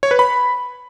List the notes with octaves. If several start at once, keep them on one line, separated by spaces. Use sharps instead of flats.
C#5
B4
B5